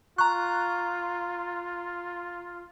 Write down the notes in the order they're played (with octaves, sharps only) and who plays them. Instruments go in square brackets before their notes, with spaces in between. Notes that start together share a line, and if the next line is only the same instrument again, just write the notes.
[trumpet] F4 [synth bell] A#5 F#6 [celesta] C#6